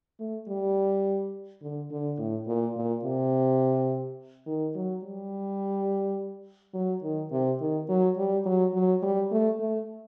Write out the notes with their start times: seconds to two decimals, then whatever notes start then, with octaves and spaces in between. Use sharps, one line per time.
0.19 A3
0.48 G3
1.62 D3
1.91 D3
2.18 A2
2.47 A#2
2.76 A#2
3.04 C3
4.46 D#3
4.75 F#3
5.03 G3
6.74 F#3
7.02 D#3
7.32 C3
7.60 D#3
7.89 F#3
8.17 G3
8.45 F#3
8.74 F#3
9.02 G3
9.31 A3
9.60 A3